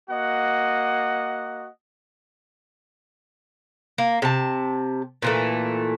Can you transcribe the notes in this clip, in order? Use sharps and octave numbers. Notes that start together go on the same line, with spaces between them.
A#3 F#4 D#5 F#5
A#3
C3 A5
A#2 E3 A3